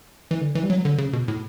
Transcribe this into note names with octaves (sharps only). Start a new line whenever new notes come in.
E3
D3
E3
G3
F#3
D3
C#3
B2
A2